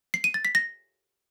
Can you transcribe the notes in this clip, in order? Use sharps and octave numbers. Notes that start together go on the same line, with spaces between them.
C7
D#7
A6
B6
A#6